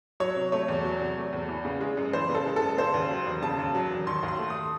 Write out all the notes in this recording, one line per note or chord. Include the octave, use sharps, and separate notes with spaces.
F#3 C#5
C3
A3 C#5
E2
F#3
C3
A3
E2
E3
C#3
G#3
F#2
E3 C5
C#3
A4
G#3
A4
F#2
C#3 C5
D#2
F#3
E1
C#3 A5
D#2
F#3
E1
D#3 C6
D#2
C6
A3
D#6